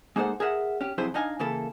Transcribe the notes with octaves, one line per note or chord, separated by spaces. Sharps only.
G#3 A#3 D#4 A4 C5 F#5
G#4 A#4 E5 F#5
C#4 G4
F2 C3 F#3 E4 G#4 C5
D4 D#4 D#5 F5 G#5
C#3 E3 A#3 E4 A4